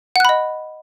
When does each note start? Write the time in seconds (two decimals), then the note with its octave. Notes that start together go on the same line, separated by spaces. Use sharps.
0.16 F#5
0.20 F#6
0.25 B5
0.29 D#5